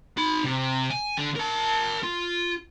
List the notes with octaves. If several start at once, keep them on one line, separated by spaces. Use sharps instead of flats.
D#4 B5
C3
G#5
D3
A#4 A5
F4